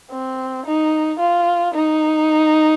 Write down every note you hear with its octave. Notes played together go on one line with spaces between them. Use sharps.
C4
D#4
F4
D#4